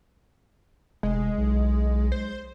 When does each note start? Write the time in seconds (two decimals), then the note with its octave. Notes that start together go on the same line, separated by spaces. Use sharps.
1.03 F1 G#3
1.38 B1
2.12 C5